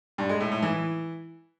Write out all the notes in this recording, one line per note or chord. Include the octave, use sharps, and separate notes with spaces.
G2
G#3
A2
A2
E3